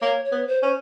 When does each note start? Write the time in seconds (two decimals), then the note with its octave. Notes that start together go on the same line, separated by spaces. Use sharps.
0.01 A#3 C#5
0.25 C#5
0.32 B3
0.47 C5
0.62 C#4 C5